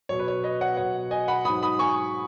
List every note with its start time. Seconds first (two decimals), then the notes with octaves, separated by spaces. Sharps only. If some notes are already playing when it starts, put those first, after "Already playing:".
0.09 B2 F#3 C#5
0.19 B4
0.28 C#5
0.44 B4 D#5
0.61 C#5 F#5
0.77 B2 F#3 C#5 F#5
1.11 D#5 G#5
1.28 F#5 B5
1.45 G#2 F#3 B5 D#6
1.63 B5 D#6
1.79 G#5 C#6